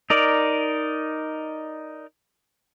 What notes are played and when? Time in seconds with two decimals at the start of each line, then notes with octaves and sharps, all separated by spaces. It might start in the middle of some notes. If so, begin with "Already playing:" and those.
0.10 D#4 A#4 D5